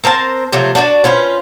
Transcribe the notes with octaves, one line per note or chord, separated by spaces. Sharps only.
C4 A#4 C5 A5
C3 F3 F#3 A3
D4 F#4 B4 D5
C#4 F4 B4 C5